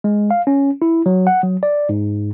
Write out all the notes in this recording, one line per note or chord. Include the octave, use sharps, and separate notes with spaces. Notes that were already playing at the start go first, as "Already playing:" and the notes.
G#3
F5
C#4
E4
F#3
F#5
F#3
D5
G#2